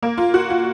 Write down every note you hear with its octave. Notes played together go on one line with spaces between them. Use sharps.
A#3
F4
F#4
F4